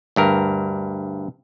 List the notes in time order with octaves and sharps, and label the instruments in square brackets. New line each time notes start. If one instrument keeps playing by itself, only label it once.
[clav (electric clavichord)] D2 G2 A#4